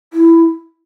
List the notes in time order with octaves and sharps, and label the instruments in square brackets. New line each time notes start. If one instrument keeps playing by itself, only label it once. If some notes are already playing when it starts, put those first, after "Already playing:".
[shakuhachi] E4